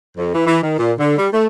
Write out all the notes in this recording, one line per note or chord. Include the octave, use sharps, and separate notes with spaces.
F2
E3
E3
D#3
A#2
D3
G3
A3